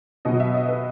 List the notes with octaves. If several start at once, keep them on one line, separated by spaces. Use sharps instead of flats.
B2 F#3 D#5
E5
D#5
B4